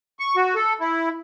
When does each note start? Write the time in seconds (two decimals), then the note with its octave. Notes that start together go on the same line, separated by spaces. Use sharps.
0.19 C#6
0.36 F#4
0.55 A4
0.80 E4